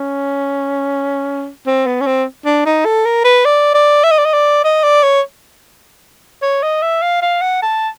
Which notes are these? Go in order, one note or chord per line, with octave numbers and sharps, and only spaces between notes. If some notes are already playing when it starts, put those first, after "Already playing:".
Already playing: C#4
C4
B3
C#4
C4
D4
D#4
A4
A#4
B4
D5
D5
E5
D#5
D5
D#5
D5
D#5
D5
C#5
C#5
D#5
E5
F5
F5
F#5
A5